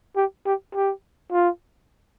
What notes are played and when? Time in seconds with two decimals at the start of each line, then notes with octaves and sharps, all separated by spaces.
0.16 G4
0.46 G4
0.75 G4
1.32 F4